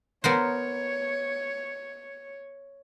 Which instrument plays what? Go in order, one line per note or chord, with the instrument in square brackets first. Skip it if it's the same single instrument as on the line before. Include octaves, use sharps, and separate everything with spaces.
[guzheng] B3 A#4 C5 [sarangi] C#5